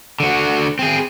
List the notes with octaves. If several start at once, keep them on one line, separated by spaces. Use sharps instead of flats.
D3 F#4
C4 G#4